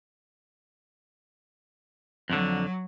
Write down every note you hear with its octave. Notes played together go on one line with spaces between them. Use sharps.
F2 D3 F#3